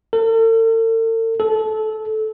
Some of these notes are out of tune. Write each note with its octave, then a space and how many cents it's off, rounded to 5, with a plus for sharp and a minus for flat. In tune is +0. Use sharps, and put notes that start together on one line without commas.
A4 +45
A4 -20